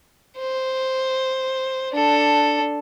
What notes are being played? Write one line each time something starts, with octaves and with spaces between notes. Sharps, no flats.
C5
D4 A4